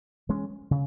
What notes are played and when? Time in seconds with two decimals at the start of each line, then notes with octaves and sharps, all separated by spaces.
0.29 E3 G#3 C#4
0.71 C#3